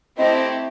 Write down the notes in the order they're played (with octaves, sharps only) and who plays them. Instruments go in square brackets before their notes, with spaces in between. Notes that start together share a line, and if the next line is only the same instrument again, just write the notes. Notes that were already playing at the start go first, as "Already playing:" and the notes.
[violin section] A3 C4 E4 G4 C5 [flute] D#5